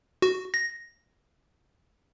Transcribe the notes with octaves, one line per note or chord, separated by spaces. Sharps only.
F#4
A#6